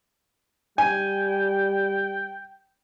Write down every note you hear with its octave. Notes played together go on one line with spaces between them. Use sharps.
G3 G5 G#5